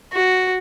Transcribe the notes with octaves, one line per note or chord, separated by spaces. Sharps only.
F#4